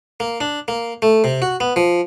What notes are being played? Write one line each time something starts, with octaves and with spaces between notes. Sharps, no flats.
A#3
D4
A#3
A3
C3
F#4
B3
F3